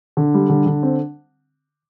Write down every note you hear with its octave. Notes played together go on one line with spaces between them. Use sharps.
D3
G3
D3
D3
C4